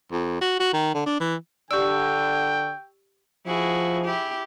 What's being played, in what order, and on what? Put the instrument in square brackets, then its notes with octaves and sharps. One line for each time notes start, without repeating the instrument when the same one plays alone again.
[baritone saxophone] F2
F#4
F#4
D#3
D3
D4
E3
[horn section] D3 [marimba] G4 D5 [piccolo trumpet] G5 [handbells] C#6 E6
[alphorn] F3 [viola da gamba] E4 F#4 G#4
[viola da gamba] E4 G4